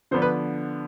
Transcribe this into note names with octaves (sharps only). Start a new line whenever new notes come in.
D3 F3 B3 D4 C5
B4